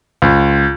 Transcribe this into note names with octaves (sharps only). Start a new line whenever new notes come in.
C#2